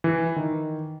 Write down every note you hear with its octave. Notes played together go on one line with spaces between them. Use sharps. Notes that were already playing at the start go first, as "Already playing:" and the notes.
E3
D#3